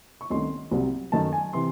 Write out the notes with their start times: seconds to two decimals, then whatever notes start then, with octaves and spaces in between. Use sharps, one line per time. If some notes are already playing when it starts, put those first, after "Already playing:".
0.21 C#6
0.30 C2 C3 D#3 A3 C#4 C6
0.71 C2 C3 F#3
1.12 F#2 D#3 A3 A5
1.33 G#5
1.53 C3 E3 C6